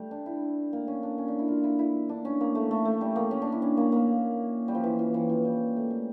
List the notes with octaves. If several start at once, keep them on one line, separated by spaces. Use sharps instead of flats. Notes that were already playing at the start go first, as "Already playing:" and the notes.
Already playing: G3 A3
D4
E4
A#3
C#4
D4
C#4
D4
E4
F4
E4
E4
D4
C#4
A#3
A3
A3
A3
G3
A#3
C#4
D4
E4
C#4
A#3
A#3
G3
F3
E3
F3
E3
F3
G3
A3
G3